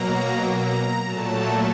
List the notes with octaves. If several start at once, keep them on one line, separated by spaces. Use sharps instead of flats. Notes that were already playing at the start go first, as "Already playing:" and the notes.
Already playing: B2 F#3 A#3 A#5
A#5
A#2 F#3 A3 A5